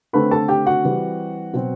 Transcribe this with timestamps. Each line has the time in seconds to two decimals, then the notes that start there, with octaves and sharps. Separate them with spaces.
0.13 D3 A3 C4 B4 B5
0.31 A4 A5
0.48 G4 G5
0.66 F#4 F#5
0.84 E3 G3 C4
1.53 B2 F#3 C4